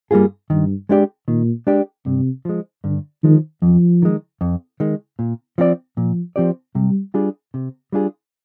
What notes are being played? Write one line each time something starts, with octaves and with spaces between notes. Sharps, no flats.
G2 G3 A#3 F4 G#4
G2 D#3
G#3 D4 G4 D5
A#2 D#3
G#3 D4 G4 D5
G2 C3
F3 G#3
G2 D3
D#3 F3 G#3
F2 F3
D#3 G#3
F2
D#3 G#3
A#2
F3 C4 G4 D5
A#2 F3
F3 C4 G4 D5
C3 G3
G3 D4 F4 G#4
C3
G3 D4 F4 G#4